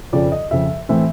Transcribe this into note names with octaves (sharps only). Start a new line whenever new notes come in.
F2 C#3 F3 D5
D#5
F2 C#3 F3 E5
A2 E3 A3 C4 E5